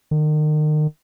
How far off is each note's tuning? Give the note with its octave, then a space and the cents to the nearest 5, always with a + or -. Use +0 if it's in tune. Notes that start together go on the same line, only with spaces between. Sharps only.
D#3 -35